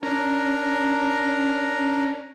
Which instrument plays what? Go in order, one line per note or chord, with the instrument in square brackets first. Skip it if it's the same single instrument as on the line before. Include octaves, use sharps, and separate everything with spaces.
[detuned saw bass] C#4 [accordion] D4 A#4 A#5